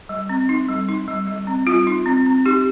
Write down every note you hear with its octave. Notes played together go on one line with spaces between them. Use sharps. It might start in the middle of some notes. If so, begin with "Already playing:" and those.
G3
C4
D#4
G3
D#4
G3
G3
C4
G3 F4
D#4
C4
C4
D#4 G4